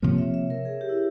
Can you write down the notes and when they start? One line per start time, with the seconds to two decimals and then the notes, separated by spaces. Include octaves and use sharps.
0.02 C3 F3 A#3 C#5
0.18 E5
0.34 E5
0.50 A#4
0.65 G#4
0.81 G4
0.89 E4